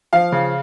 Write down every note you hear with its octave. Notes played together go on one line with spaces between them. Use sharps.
F3 F5
C#3